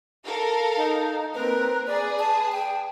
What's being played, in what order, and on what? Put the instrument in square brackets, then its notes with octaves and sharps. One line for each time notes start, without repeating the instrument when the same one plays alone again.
[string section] A4 A#4 F5
[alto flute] D#4
[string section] A#3 C4 A#4 [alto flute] B4
[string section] G#4 B4 [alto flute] D5
[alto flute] A5
G5